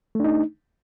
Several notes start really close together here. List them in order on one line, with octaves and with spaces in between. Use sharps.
A3 D4 D#4